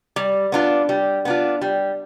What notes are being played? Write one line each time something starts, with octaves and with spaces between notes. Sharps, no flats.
G3
B3 D4 F4
G3
B3 D4 F4
G3